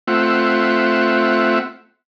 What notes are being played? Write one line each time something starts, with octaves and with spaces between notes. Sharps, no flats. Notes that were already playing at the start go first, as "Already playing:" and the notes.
A3 C4 F4 E5 F#5